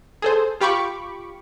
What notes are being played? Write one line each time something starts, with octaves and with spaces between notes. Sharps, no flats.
G#4 A4 C5
F4 G4 B5 C#6 D6